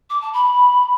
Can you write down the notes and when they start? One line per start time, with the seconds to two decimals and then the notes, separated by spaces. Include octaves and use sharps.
0.10 D6
0.22 A5
0.33 B5